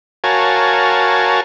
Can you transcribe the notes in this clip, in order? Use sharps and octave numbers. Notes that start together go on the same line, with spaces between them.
F#4 A#4 C#5 F5 G#5 A5